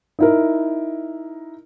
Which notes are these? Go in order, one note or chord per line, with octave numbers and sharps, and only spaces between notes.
D#4 E4 A#4